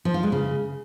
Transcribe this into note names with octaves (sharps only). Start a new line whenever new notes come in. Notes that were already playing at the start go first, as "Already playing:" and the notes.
F3
F4
G#3
C#3